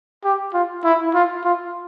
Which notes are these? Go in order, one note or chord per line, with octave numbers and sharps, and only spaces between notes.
G4
F4
E4
F4
F4